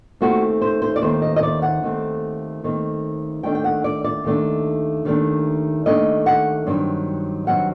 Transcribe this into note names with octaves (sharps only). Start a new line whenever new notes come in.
D#2 D#3 A3 C4 F#4
C5
C5
D5
D#2 D#3 A3 C4 C5
D#5
D#5
D5
F#5
D#2 D#3 A3 C4
D#2 D#3 A3 C4
D#2 D#3 A3 D4 G5
G5
F#5
D5
D5
D#2 D#3 A3 D4
D#2 D#3 A3 D4
D#2 D#3 A3 D4 D#5
F#5
G2 D#3 F#3 C4
G2 D#3 F#3 C4 F#5